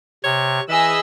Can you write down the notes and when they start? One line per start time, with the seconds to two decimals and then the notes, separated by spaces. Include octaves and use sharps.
0.24 C3 C#5
0.68 E3 G#4 D#5 B5 E6